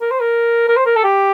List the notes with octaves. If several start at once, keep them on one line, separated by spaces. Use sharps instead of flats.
A#4
C5
A#4
A#4
C5
A#4
A4
G4